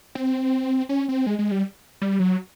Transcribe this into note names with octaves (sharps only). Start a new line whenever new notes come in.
C4
C#4
C4
G#3
G#3
G3
G3
F#3